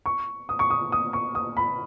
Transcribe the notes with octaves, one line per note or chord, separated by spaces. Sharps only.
C#6
D#6
C#6
D#6
D#6
C#6
D#6
B5